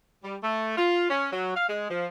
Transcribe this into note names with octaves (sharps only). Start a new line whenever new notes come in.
G3
A3
F4
C#4
F#3
F5
G#3
F3